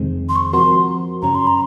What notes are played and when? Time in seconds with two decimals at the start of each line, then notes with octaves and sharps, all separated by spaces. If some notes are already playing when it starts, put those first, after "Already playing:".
Already playing: F2 C3 D#3 G#3 C4
0.29 C6
0.36 C#6
0.53 F3 C4 F#4 A#4 C6
1.22 F#2 C#3 F#3 C#4 A#5
1.35 C6
1.47 A#5